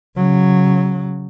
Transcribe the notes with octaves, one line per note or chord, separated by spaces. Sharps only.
C#3 F#3